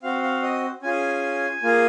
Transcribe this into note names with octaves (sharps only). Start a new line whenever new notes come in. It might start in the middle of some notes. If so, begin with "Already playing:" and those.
C4 F#4 F5
F5
D#5
C#4 F4 G#4 G#5
A#3 F4 G#4